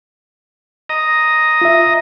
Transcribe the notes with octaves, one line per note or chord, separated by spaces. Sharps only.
D#5 A#5
F4 E5